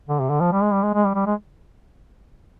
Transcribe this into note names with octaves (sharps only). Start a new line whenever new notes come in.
D3
C3
D3
F3
G3
G#3
G3
G#3
G#3
G3
G3
G#3